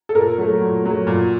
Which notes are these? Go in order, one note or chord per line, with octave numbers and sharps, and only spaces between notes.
A4
A#2 A#4
F#3 A3
A#2
F#3 A3
A#2